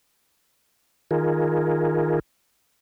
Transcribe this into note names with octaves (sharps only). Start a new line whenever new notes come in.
D#3 F4 G#4 A#4